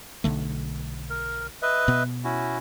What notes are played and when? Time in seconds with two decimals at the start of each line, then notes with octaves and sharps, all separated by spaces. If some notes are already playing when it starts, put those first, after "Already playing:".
0.24 B1 D3 A3
1.10 A#4
1.62 B4 D#5 E5
1.88 B2 B3
2.24 C#4 E4 F#4